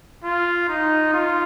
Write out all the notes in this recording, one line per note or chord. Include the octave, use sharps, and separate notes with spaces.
F4
D#4
F4